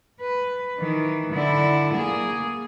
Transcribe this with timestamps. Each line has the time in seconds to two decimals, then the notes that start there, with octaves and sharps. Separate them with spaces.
0.21 B4
0.78 D#3 E3
1.33 D3 E4
1.93 A#3 G#4